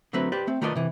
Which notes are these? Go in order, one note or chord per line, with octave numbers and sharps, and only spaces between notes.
D3 F#3 A3 C4 B4
G4 B4 C5 D5
A3 C4
D#3 A3 F4 B4 D5 D#5
C3 E3